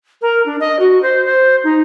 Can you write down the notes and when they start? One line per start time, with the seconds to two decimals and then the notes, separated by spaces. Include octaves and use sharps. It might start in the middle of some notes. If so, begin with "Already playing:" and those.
0.22 A#4
0.46 D4
0.60 D#5
0.79 F#4
1.02 C5
1.25 C5
1.64 D#4